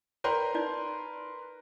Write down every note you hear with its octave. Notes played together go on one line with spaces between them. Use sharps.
A#4 B4 D5 G5 B5 C6
D#4 D5